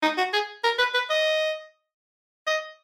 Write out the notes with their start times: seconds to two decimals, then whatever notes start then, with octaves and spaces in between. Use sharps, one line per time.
0.02 D#4
0.18 F#4
0.33 G#4
0.64 A#4
0.79 B4
0.94 B4
1.10 D#5
2.47 D#5